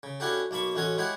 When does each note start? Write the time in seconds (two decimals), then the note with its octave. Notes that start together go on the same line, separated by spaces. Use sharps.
0.03 C#3
0.20 C#4 D4 E4 F#4 G4 A4
0.51 B1 A#3 A5 B5 C#6
0.76 A1 A3 C#4 F#4 C#5 D#5
0.98 G#3 E4 G4 C#5 F#5